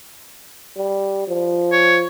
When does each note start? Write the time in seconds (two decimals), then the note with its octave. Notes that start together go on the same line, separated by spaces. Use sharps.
0.76 G3
1.28 F3
1.72 C#5